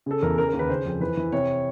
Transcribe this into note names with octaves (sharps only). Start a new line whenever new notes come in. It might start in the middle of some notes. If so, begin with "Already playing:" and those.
C#3 A4
E2 A#4
C#3 A#4
A#4
D#2
B4
C#3 C5
F2
E3 B4
E3
C3 C#5